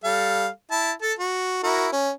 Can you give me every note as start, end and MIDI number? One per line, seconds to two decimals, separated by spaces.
0.04 0.47 55
0.04 0.47 69
0.04 0.47 77
0.71 0.92 64
0.71 0.92 81
1.02 1.13 69
1.02 1.13 81
1.19 1.62 66
1.64 1.88 64
1.64 1.88 66
1.64 1.88 70
1.92 2.10 61